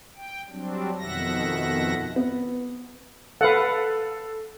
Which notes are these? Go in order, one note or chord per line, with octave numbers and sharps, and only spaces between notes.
G5
F#3 G3 C4 D4
F2 B2 D#3 E5 F#5 A#6
B3
A4 B4 F5 F#5